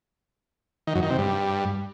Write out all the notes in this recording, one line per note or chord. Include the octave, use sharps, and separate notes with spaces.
D#3
F#2
D#3
C3
G2